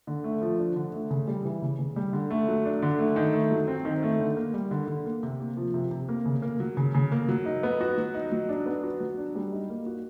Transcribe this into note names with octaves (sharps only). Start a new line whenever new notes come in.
D3
A3
F3
D4
D3
A3
C#3
G3
E3
C#3
C#3
G3
D3
A3
F#3
D4
D3
A3
D#3
A3
F#3
C4
D#3
A3
D3
A#3
G3
D3
D3
A#3
C3
A#3
F3
C3
C3
A#3
C#3
A#3
F#3
C#3
C#3
A#3
F#3
D#4
B3
F#4
F#3
D#4
F#3
D4
B3
F#4
F#3
D4
G3
D#4
A#3
F#4